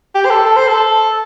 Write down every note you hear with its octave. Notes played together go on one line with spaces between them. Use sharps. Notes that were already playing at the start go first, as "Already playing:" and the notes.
G4
C5
A4
A4
C5
A4